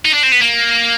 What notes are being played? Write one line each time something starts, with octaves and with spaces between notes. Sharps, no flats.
D#4
D4
C4
B3
A#3